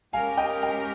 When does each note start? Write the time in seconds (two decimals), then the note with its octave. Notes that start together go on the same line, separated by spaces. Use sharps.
0.13 G#3 C#4 G4 A#4 F5 G#5
0.37 D#5 G5
0.63 D#5 G5